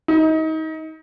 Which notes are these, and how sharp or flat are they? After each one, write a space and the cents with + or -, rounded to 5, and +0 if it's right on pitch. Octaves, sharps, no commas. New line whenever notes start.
D#4 +30